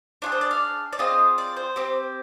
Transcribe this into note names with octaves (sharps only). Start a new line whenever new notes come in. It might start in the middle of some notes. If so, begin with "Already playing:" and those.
D4 F4 G#4
C5
D5
F5
D5
C4 F4 G#4 D#5
D5
C5
C4 G4